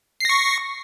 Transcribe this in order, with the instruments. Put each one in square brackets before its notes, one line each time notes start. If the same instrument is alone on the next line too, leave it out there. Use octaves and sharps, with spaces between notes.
[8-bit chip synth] C7
A#6
C#6